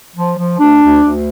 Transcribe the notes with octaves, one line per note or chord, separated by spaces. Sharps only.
F3
F3
D2 D4
D2
D2